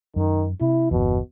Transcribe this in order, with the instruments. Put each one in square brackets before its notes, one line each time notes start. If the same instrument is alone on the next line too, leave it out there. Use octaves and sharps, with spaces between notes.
[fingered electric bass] F#2 [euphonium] D#3
[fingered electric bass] C3 [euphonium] E4
[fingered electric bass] G1 E2 [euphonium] B2